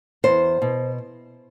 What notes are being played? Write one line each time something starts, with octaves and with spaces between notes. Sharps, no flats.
E2 C5
B2